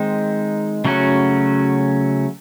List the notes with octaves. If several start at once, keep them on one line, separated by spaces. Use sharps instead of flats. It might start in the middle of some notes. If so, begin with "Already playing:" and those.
Already playing: D#3 G#3 C4 D#4
C#3 F#3 A3 C#4 F#4